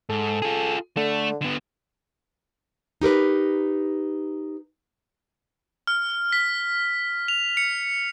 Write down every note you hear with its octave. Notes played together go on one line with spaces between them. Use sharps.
G#2 A4
F4 G#4
D3 A3
D3 B3
D#4 G4 A#4 B4
F6
B6
F7
C#7